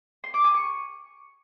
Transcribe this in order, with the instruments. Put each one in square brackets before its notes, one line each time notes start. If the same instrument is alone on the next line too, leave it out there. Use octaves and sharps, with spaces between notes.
[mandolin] C6
D6
G#5
C#6